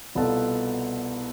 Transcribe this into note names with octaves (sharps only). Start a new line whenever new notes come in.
C2 B2 B3 F4 A4